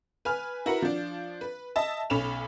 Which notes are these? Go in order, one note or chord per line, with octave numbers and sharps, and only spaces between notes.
B4 G#5 F6
E4 F#4 A#4 B4 F#5
F3 D4
B4
D#5 E5 A5
B1 C#4 A4 B5 E7 F7